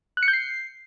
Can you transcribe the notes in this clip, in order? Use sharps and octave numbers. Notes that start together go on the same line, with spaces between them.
F#6
C#7
G6
C7